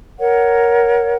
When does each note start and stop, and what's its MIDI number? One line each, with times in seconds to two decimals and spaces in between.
0.19 1.15 70
0.19 1.15 73
0.19 1.15 78